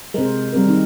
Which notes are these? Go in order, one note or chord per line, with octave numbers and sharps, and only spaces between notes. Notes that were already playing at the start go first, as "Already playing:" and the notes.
C3 G#3 A#4 C5
G3 C4 A#4
D#3 C4 D#4